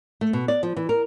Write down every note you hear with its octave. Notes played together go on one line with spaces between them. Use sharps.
A3
B2
D5
F3
E3
A#4